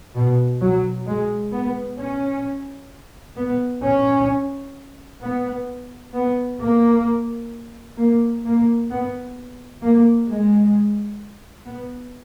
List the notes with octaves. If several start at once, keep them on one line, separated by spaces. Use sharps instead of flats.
B2
F#3
G#3
B3
C#4
B3
C#4
B3
B3
A#3
A#3
A#3
B3
A#3
G#3
B3